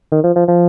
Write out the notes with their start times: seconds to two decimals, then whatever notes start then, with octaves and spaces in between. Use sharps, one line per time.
0.12 D#3
0.24 F3
0.36 F3
0.48 F3